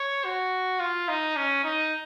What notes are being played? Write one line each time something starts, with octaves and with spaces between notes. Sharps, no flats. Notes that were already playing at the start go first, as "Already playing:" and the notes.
Already playing: C#5
F#4
F4
D#4
C#4
D#4